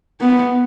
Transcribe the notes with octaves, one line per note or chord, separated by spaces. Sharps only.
B3